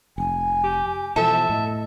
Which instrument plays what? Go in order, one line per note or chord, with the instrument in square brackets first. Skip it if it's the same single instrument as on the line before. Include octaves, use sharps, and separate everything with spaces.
[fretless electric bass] F1 [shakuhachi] G#5
[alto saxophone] G4
[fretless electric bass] B2 E3 F3 [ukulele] A4 [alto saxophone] E5
[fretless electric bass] A2 [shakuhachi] D#5